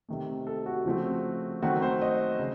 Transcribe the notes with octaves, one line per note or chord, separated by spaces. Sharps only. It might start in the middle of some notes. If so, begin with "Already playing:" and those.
C3 D#3 A3
A4
F#4
C#3 F3 A3 C4
D#3 F#3 A3 C4 F#4
C5
D#5
C#3